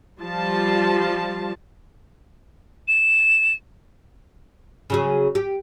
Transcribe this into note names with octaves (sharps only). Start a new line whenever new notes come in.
F3 G3 F4 A5
E7
C#3 F#3 G#4
G4